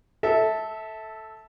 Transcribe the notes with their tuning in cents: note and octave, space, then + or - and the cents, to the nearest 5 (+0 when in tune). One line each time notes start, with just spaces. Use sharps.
A4 +0 E5 -20